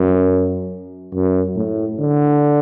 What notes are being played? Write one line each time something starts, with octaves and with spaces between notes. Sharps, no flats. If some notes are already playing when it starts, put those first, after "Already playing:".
Already playing: F#2
F#2
A2
D3